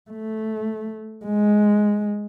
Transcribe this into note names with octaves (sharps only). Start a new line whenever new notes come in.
A3
G#3